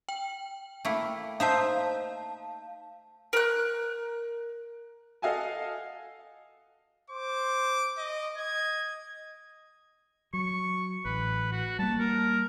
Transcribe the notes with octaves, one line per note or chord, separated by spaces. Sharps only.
G5
A3 A#3 E4
D#4 C5 E5 F5 A5
A#4 F#6
A4 D#5 F5 F#5 G#5 A5
C5 D6
D#5
D#5 G#6
F#3 C#6
A1 B4
F#4
G3 A#3 A5
A#4